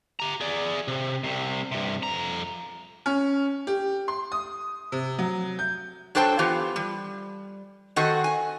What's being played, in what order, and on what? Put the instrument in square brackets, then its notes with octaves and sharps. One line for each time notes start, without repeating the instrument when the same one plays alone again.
[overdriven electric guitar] G4 A#5
G#4 D5
C3
C2 C3
G2 C3
F2 A#5
[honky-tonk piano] C#4
G4
C6
D#6
C3
F#3
G6
[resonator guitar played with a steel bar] F#3 D4 A4 C5 G5 A5
E3 B3 F4 G4
G3
D#3 C4 F#4 A4 D#5 F#5
G#5